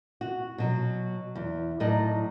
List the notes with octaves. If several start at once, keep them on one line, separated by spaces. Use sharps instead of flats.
F#4
B2 F#3
E2
A2 F#3 D#4 D5 D#5